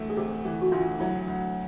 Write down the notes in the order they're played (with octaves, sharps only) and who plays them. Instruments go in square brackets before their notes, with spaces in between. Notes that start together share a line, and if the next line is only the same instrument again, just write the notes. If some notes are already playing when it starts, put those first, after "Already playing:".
Already playing: [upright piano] D2 E3 A3
[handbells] G#4
[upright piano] C3 [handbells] G4
[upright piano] E3 [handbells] G4
[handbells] F#4
[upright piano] D2 [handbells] F4
[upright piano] F#3 [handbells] E4
[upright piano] D2